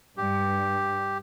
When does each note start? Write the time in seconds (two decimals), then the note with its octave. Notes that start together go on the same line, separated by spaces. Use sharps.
0.17 G2 G4